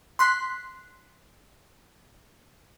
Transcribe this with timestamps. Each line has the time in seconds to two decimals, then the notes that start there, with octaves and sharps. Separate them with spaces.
0.19 C6 F#6 B6 C7